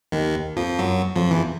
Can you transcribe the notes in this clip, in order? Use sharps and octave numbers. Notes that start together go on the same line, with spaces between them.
D#2 D#3
F2 F3
F#2 F#3
F2 F3
E2 E3